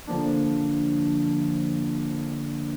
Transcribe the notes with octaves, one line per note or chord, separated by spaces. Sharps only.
D3 F3 A#3 D4